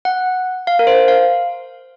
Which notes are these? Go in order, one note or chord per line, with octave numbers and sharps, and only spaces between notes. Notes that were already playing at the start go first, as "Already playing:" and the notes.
F#5
F5
A#4
C5
F5